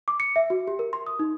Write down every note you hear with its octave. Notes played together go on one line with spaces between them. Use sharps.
D6
C#7
E5
F#4
G4
A#4
C6
D#6
D#4